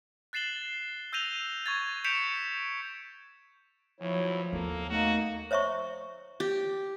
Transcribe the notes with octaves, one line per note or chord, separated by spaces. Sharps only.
F#6 A6 C7 E7 F#7 G7
E6 G6 A#6 D#7 F7 G7
C#6 G#6 A6
G6 B6 C#7 D7 E7 F7
E2 F3 F#3 E4 C#5
D#2 A#3 B3 A4
A3 A#3 D#4 F#4
C5 C#5 E5 A#5 C#6
G4